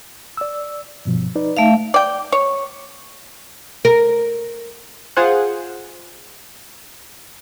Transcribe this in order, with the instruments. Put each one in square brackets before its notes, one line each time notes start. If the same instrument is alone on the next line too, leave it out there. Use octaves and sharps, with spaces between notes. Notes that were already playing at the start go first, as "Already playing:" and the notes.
[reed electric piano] D5 E6
G2 B2 F3
D#4 B4 D5
[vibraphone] A3 E5 F5 [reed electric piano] D#4
[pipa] D5 G5
C#5
[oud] A#4
[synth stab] F4 G#4 C5 F#5